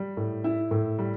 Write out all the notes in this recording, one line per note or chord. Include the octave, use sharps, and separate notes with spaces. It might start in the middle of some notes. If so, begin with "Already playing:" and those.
Already playing: G3
A2
E4
A2
G3